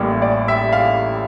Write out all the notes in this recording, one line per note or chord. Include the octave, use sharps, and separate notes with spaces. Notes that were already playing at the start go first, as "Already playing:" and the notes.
Already playing: A1 A2 G3 A#3
D5
E5
F5